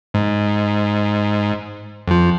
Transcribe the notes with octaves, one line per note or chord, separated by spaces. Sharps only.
G#2
F2 F3